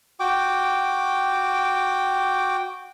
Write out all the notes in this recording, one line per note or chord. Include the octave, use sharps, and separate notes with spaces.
F#4 G5 D6